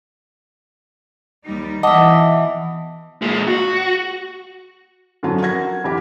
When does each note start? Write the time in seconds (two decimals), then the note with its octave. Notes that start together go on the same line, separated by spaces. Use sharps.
1.46 D#2 G3 D#4
1.83 B2 E3 D#5 E5 F#5 A5 D6
3.22 A#2 G#3
3.47 F#4
5.23 F#2 D3 F3 F#3
5.42 F#4 A#4 G#6 A#6
5.84 F1 E3 G4